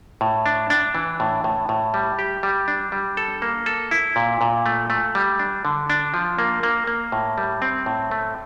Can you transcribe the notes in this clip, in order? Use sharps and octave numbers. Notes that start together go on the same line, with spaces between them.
A2
D4
D4
E3
A2
A2
A2
G3
G4
G3
D4
G3
A4
A#3
A4
E4
A#2
A#2
A3
A3
G3
D4
D3
D4
F3
A#3
A#3
A#3
A2
G3
C4
A2
A3